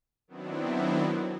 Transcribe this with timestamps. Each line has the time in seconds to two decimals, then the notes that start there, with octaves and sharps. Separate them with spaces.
0.28 D#3 F#3 B3 C4 D4 E4